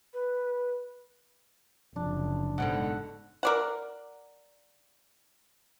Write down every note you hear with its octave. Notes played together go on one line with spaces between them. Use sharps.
B4
F#1 D#2 C3 F3 D4
G#2 B2 D3 F#5
A#4 D5 F#5